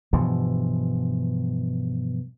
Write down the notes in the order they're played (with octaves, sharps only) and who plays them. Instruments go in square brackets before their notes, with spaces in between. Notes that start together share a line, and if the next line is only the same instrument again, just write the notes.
[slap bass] G2 B2 E3 F3